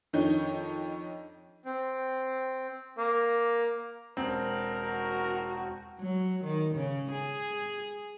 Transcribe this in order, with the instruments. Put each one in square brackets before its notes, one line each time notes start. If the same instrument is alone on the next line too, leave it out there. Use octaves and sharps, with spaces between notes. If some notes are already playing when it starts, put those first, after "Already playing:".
[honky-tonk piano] F2 D#3 D4 D#4 C#5 G6
[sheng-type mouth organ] C4
[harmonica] A#3
[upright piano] E1 C4 [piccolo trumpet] A#4
[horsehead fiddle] F#4
[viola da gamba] F#3
D#3
C#3
G#4